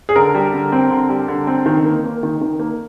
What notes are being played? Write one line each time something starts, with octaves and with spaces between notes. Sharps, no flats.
G#4
D3 A#4
G3
D3
C4
D3
G3
D3
C4
D#3
A#3
A#3
D#3
D#3
A#3